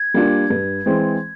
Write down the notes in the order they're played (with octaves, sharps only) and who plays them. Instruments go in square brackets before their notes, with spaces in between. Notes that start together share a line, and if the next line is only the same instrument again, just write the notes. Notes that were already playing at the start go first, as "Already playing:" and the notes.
Already playing: [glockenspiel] G#6
[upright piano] G3 A#3 D4 F4
G2
E3 G#3 C4